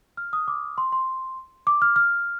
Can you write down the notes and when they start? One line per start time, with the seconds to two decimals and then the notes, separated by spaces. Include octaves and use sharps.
0.17 F6
0.33 D#6
0.48 D6
0.78 C6
0.92 C6
1.67 D6
1.82 F6
1.96 F6